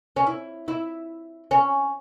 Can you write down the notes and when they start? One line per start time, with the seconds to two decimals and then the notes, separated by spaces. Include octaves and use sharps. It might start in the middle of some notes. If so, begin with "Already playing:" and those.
0.16 C#4
0.27 E4
0.68 E4
1.51 C#4